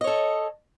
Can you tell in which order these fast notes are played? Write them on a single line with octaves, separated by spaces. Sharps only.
D#5 C#5 A4